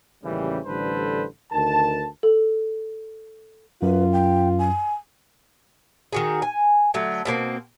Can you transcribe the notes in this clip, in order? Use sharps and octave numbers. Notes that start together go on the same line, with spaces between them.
A1 D#2 C#3 E3 G3
A1 D3 G3 A4 B4 C5
D2 D#3 A#4 A5
A4
F#2 F4 B4
G5
G#5
D#3 F#4 G#4
G#5
D3 F#3 A3
B2 A3 A#3 C4